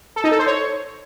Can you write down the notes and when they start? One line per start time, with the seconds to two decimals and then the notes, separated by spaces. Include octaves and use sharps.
0.16 A4
0.24 D#4
0.31 A4
0.39 C5
0.47 C#5